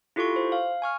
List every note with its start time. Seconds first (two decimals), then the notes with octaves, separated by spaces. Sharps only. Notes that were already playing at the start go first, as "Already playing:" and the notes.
0.16 E4 F4 G4 A4 C6 C#6
0.36 C5
0.52 F5
0.82 G#5 C#6 F6